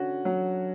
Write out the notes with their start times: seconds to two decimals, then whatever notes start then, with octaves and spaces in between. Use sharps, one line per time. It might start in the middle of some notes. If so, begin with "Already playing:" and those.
Already playing: D3 C#4 F#4
0.25 F#3